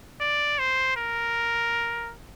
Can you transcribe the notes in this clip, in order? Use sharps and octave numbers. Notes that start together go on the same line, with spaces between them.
D5
C5
A#4